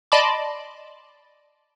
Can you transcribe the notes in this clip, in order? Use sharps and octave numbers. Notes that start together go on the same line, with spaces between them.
D5 D#5 A5 B5 C6 D6